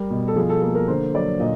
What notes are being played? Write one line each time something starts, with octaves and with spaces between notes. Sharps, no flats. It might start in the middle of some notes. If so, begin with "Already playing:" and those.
Already playing: G3 A#4
B2
A4
F3 G#4
A4
A#3 A4
A#4
D3 C5
F#3 D5
A#2 D#5